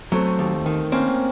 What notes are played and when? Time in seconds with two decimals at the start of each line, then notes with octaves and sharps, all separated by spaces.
0.12 F#3 A3 C4
0.39 D#2
0.66 D#3
0.92 A#3 C4 C#4